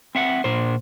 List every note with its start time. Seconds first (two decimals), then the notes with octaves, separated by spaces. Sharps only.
0.15 C4 E5 F#5
0.44 A#2 C5